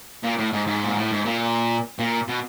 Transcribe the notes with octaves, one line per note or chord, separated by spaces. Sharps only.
A#2
A2
G#2
G#2
A#2
A2
G#2
A#2
A#2
B2